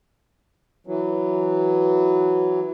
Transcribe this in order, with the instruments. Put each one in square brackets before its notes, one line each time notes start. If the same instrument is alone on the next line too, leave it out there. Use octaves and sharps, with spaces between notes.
[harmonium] E3 F#3